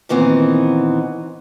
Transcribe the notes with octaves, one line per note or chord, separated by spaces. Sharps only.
A#2 D#3 E3 B3 C4